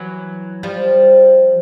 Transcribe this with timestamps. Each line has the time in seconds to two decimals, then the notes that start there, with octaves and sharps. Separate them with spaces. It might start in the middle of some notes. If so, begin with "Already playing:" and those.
Already playing: E3 F#3
0.63 F3 G3